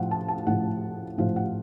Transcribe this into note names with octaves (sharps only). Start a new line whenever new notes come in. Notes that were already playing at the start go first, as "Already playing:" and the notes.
Already playing: A2 F3 F#5
A5
A5
A2 F3 F#5
A2 F3 F5
F#5